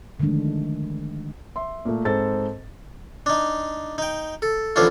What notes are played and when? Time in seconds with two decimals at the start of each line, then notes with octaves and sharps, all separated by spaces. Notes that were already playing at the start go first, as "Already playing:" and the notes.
0.20 D3 D#3 F3 G#3 A3 D4
1.56 E5 C6
1.85 A#2 A3
2.05 G#2 C4 A4 A6
3.26 D4 D#4
3.98 D#4 G5
4.42 A4
4.76 A1 D3 F3 D4 E4 F4